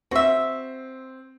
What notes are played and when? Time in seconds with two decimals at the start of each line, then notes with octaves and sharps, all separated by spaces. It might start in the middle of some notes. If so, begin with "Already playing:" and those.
0.11 C4 F#4 E5